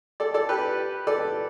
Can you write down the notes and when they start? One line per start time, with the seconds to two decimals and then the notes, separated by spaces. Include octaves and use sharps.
0.20 A4 D5
0.34 A4 D5
0.49 G4 B4
1.07 A4 D5